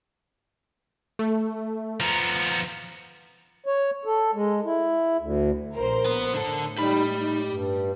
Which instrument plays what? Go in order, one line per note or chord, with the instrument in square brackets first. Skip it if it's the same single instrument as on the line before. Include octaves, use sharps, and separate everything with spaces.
[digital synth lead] A3
[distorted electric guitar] F3 B3 [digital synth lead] A#5
[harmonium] C#5
A4
G#3
E4
D2
[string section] A#1 A#4 C5
[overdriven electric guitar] B3
[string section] A2 [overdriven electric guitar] D3 A4
[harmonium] G3 D#4 [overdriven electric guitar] G4 B5
[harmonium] D#4
G2